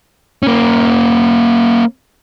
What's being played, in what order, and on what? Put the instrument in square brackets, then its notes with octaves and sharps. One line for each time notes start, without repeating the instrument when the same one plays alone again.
[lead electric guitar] A#3 C#4